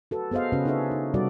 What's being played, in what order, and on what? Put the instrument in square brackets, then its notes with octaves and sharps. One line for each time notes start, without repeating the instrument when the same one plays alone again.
[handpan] F#4 A4 B4
B3 G#4 C5 D#5 F5
C#3 C#4 F#4 B4
D4 D#4 G#4 A4 C#5 E5
D#4
C3 G3 F#4 A4 D5